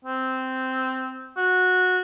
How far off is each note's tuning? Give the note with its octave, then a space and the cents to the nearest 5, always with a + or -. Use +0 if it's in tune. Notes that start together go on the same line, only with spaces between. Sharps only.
C4 -10
F#4 -15